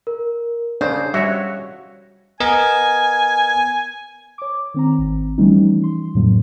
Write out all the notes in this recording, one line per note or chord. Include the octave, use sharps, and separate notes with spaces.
A#4
C#3 D4 C5
C#3 G3 G#3 F#4 C#5 E5
B3 A#4 D#5 G#5
C#5 D6
D#3 C4 A#5
G#1
E3 F3 G3 A3 C#4 D#4
C6
F2 A2 C#3 F#3 A#3